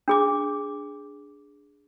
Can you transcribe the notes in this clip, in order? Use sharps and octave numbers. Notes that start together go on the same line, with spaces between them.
D4 G#4 D6